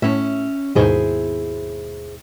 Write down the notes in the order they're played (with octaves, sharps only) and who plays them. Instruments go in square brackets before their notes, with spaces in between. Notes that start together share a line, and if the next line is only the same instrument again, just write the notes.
[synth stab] A2 [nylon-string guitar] C#4 E5
[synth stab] D#2 G#2 B2 [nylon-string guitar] E4 G#4 C5